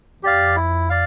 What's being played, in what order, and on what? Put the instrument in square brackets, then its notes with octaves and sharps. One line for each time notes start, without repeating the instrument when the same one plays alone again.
[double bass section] F2 [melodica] G4 D5 F5
[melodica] E4
D5 F5